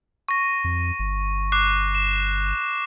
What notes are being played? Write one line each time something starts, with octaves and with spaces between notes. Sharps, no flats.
C#6 A#6
F2
G1
D6 F#6 C7
E7